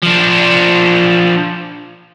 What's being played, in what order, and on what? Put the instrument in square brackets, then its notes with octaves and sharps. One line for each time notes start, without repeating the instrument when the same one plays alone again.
[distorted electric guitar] F3 D4